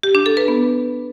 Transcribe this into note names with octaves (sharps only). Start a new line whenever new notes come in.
G4
D4
A4
B4
B3